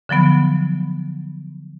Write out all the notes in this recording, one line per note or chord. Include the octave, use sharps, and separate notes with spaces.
D3 F3 F#3 B3 B5